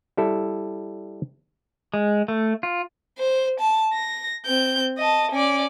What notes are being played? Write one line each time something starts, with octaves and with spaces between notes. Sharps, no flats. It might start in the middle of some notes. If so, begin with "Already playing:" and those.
G3 E4 A4
G#3
A3
F4
C5
A5
A#6
C4 G6
D#5 A5
C#4 D5